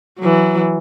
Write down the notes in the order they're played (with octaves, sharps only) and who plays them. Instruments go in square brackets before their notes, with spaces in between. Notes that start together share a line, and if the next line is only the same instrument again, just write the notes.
[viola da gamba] E3 F#3